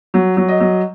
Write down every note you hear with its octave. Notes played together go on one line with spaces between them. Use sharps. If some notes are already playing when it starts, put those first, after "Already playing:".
F#3
F#3
D#5
F#3